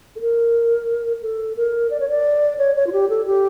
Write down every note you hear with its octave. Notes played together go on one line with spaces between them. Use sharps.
A4
A#4
A4
A#4
D5
C#5
D5
C#5
C#5
F4
G4
A4
G4